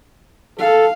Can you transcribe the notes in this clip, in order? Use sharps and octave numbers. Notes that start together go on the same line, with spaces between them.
A4 F5